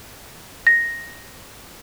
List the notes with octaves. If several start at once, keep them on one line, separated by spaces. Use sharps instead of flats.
A#6